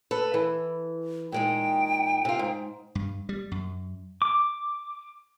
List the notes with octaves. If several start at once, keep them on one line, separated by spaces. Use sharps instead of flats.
A4 B4
E3
A#2 G#3 D#4 G5
C3 F4
G#2
G2
G3
F#2
D6